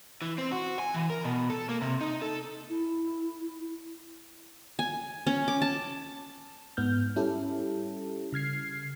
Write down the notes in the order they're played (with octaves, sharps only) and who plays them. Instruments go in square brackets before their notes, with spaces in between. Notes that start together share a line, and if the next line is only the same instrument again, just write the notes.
[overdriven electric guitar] E3
C4
F#4
G#5
E3
A#4
B2
A4
A#3
C3
D#4
A4
[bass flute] E4
[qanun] G#5
C#4
D6
A5
[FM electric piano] G#2 B3 F6 G6
G3 C#4 E4 G4 A4
C#3 F6 G#6 C7